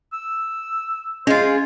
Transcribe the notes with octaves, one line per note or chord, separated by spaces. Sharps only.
E6
G#3 C#4 F4 C5